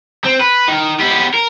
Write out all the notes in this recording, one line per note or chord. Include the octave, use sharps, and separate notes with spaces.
C4
B4
D#3
B3 G4
A#4